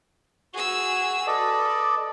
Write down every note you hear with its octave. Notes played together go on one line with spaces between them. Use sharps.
F#4 G#4 E6
A4 B4 D5 D#5